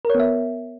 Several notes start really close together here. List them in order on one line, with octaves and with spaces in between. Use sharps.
A#4 C#5 B3 E5